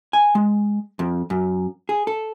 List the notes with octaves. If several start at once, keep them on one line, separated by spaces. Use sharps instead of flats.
G#5
G#3
F2
F#2
G#4
A4